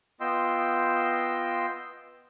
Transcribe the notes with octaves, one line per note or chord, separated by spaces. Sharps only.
B3 F4 D#5 G5 C6 E6